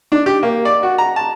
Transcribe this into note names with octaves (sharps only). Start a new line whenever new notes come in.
D4
G4
A#3
D5
F#4
A#5
A5